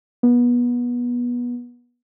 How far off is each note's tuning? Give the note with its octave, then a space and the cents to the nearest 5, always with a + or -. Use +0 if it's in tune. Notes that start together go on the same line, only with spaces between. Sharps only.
B3 -25